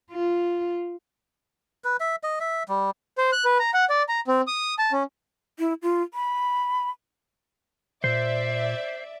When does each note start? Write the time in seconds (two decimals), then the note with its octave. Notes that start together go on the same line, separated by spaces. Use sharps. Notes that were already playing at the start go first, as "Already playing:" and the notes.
0.11 F4
1.84 B4
2.00 E5
2.23 D#5
2.40 E5
2.68 G3
3.18 C5
3.33 F#6
3.45 B4
3.60 A#5
3.74 F#5
3.90 D5
4.09 A#5
4.27 C4
4.47 D#6
4.79 A5
4.92 C#4
5.59 E4
5.82 F4
6.14 B5
8.04 A#2 C5 D5 E5